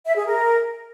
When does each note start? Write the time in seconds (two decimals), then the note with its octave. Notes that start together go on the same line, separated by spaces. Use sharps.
0.05 E5
0.16 G#4
0.26 A#4